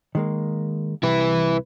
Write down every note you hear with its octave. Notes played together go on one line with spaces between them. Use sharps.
D#3 G#3 A#3
C2 E4 B4